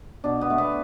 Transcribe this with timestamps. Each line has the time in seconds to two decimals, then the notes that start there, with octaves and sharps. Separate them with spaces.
0.24 B2 D4
0.41 B3
0.50 A3
0.58 B3